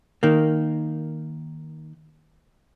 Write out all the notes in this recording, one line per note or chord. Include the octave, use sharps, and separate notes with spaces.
D#3 A#3